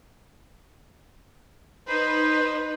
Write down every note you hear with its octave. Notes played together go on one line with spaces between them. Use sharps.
D#4 B4 C5